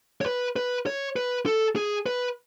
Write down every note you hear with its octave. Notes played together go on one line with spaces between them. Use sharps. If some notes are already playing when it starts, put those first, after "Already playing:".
C#5
B4
B4
C#5
B4
A4
G#4
B4